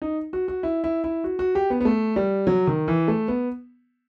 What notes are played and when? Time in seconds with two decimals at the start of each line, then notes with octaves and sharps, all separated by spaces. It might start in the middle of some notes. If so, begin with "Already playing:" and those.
0.02 D#4
0.33 F#4
0.48 F#4
0.63 E4
0.84 E4
1.04 E4
1.24 F#4
1.39 F#4
1.55 G4
1.70 B3
1.81 B3
1.85 A3
2.16 G3
2.47 F#3
2.67 D#3
2.88 E3
3.08 A3
3.28 B3